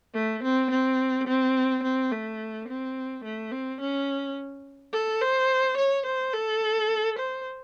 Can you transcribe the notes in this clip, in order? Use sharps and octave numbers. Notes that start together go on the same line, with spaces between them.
A3
C4
C4
C4
C4
A3
C4
A3
C4
C#4
A4
C5
C#5
C5
A4
C5